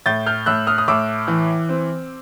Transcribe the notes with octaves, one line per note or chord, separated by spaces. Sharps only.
A2 G6 A6
F6 G6
A2 E6 F#6
D#6 F6
D#6
A2 D6 E6
E3
C4